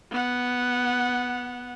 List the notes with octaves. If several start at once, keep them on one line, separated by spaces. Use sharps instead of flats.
B3 F#5